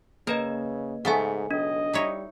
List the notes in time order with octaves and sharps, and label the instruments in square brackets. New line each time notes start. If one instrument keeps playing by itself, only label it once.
[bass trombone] C#3 [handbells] A#3 B4 D#5 [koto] A#4
[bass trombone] G#2 [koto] C#3 A3 B3 [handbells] F#5 G#5
[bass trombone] B1 [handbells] D4 [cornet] D#5
[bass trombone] G3 [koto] D#4 E4 C#5